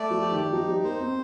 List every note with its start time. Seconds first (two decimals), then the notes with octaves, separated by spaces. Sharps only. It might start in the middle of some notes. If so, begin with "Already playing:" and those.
Already playing: A3 D5
0.11 F3
0.21 G4
0.31 D#3
0.53 F3 D#4
0.68 G3
0.84 A#3 C5
1.00 C4